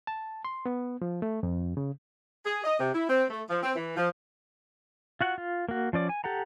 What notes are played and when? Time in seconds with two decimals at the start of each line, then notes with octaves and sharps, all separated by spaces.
0.07 A5
0.45 C6
0.66 B3
1.02 F3
1.22 A3
1.43 F2
1.77 C#3
2.45 G#4
2.64 D#5
2.80 C3
2.94 E4
3.09 C4
3.30 A3
3.50 F3
3.63 C4
3.76 E3
3.97 F3
5.21 F4 F#4 F#5
5.38 F4
5.69 A#3 F#4
5.93 F3 C#4 D5 D6
6.09 G#5
6.24 G4 A4 F#5 A#5